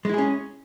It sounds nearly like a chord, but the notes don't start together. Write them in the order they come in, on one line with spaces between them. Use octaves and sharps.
G#3 E4 G#4 C#4